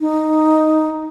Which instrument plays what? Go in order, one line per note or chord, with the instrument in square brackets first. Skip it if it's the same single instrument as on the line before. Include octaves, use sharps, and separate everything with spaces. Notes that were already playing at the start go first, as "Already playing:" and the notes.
[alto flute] D#4